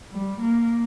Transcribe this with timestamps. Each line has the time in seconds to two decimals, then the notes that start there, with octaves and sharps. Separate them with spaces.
0.12 G3
0.40 A#3